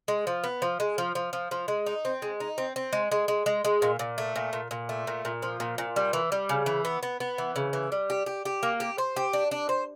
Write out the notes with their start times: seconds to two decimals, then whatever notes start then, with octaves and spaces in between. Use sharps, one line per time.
0.08 G#3
0.27 F3
0.44 B3
0.62 F3
0.80 G#3
0.98 F3
1.15 F3
1.33 F3
1.51 F3
1.68 G#3
1.86 D#4
2.05 C4
2.22 G#3
2.40 D#4
2.58 C4
2.76 C4
2.93 G#3
3.12 G#3
3.28 G#3
3.46 G#3
3.65 G#3
3.82 A#2
3.99 A#2
4.18 A3
4.36 A#2
4.53 A#2
4.71 A#2
4.89 A3
5.07 A#2
5.25 A#2
5.42 F3
5.60 A#2
5.78 A#2
5.96 G3
6.13 E3
6.32 G3
6.49 C#3
6.66 E3
6.85 B3
7.03 B3
7.20 B3
7.38 E3
7.56 C#3
7.73 E3
7.92 G3
8.10 G4
8.26 G4
8.45 G4
8.63 A#3
8.80 G4
8.98 C5
9.16 G4
9.33 D4
9.51 D4
9.69 C5